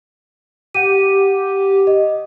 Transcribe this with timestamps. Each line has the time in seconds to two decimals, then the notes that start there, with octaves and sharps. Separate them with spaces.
0.74 G4 F#5 D#7
1.87 D#5